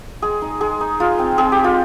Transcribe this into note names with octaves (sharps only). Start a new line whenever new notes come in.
G#3 G#4
D#4
G#3 G#4
D#4
G#3 F4
C4
C4 G#4
G4
G#3
F4